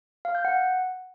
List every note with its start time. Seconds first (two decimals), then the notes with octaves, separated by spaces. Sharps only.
0.25 F5
0.35 G6
0.45 F#5